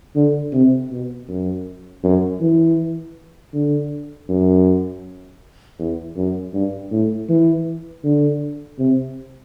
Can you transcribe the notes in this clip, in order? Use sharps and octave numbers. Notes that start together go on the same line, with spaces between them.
D3
C3
B2
F#2
F#2
E3
D3
F#2
E2
F#2
G2
A2
E3
D3
C3